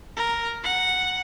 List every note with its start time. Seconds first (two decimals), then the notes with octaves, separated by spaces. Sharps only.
0.17 A#4
0.64 F#5